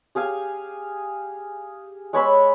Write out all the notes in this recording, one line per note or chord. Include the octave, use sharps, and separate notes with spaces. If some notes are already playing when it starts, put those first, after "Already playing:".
G4 G#4 F5 G#5
G#3 C#5 B5 E6